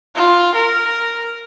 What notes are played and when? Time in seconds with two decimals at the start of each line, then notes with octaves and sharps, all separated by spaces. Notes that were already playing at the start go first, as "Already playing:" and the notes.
0.15 F4
0.55 A#4